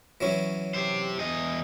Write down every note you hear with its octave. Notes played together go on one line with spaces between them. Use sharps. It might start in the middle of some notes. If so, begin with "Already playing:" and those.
E3 F#3 C#4
G4 C5
E2 D#5